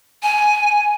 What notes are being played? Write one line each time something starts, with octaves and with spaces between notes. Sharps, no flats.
G#5